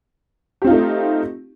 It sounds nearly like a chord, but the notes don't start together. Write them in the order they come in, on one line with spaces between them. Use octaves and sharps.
G4 C4 F4 D#4 A3